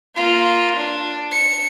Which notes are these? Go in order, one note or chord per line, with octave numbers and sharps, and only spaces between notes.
A#3 F4
D4
C#7